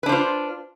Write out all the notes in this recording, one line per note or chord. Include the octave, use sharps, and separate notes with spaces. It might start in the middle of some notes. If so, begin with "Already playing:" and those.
D4 F4 B4 C5